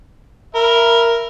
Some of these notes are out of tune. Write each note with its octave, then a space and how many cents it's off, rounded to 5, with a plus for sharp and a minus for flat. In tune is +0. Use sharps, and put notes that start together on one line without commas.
A#4 +0 E5 +20 B5 -15